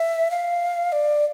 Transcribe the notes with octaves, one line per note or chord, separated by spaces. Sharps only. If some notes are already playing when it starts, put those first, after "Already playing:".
Already playing: E5
F5
D5